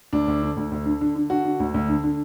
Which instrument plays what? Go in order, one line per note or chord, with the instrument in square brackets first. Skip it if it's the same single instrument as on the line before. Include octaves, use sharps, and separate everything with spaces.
[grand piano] D2 D4
D2
D3
D2
D2
D3
D3
D3
D3 F#4
D3
D2
D2
D3
D3